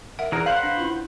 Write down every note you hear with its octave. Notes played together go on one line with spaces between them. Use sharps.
A#4 E5 F#5
E3 G#4 A#4 D5 E5
B4 C5 F5 F#5 F#6
D4
C#4 E4 F4